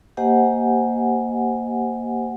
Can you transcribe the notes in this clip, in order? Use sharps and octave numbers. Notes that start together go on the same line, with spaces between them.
A#3 G4 C5 D#5 F#5 G#5